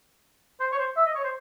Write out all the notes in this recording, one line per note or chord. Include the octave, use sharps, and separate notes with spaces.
C5
C#5
C5
E5
D#5
C#5
C5